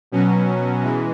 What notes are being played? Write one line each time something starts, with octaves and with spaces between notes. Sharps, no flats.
B2 F#3 C#4
E3 G#3